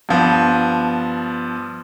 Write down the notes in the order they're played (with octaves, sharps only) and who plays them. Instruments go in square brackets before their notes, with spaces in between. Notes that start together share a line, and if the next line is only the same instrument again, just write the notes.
[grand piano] G2 F3 B3